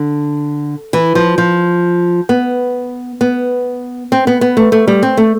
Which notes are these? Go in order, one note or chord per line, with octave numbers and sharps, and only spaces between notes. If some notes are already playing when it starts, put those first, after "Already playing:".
Already playing: D3
E3
F3
F3
B3
B3
C4
B3
B3
A3
A3
G3
C4
A3